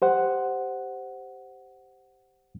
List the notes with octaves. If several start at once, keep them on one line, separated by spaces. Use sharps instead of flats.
G4 C5 F#5